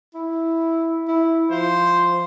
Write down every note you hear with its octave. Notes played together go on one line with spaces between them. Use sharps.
E4
E4
F3 C5